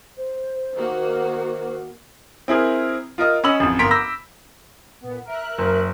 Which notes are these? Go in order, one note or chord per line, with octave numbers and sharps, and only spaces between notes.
C5
D#3 A#3 F#4
C4 E4 G#4 A#4
F4 A#4 D#5
C#4 D#5 B5 E6 F#7
A1 F2
G1 A#3 A#5 C6 B6 D7
B5 D6 E6 G6 A#6
A#2 B3
A#4 E5 F#6
F#1